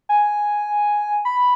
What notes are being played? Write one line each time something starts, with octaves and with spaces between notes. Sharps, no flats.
G#5
B5